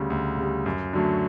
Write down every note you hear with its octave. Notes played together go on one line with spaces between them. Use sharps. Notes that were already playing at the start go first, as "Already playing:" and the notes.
Already playing: D2 C#3 G3
D2
C#3 G3
F#2
D3 F#3 A3